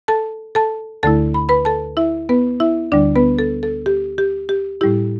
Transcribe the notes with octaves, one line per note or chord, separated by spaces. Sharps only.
A4 A5
A4 A5
D2 D3 A3 E4 A4 A5
B5
B4 B5
A4 A5
E4 E5
B3 B4
E4 E5
D2 D3 G3 D4 D5
B3 B4
A4
A4
G4
G4
G4
A2 G3 E4 G4